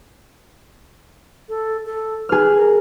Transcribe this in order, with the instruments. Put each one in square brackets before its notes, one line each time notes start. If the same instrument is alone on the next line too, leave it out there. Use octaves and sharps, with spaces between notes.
[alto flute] A4
A4
[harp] G#4 F6 [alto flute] B4
[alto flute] A#4